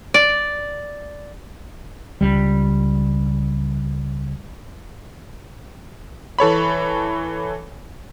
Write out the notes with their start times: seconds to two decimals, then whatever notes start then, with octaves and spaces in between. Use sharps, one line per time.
0.14 D5
2.21 C#2 G3
6.39 E3 A4 C#5 B5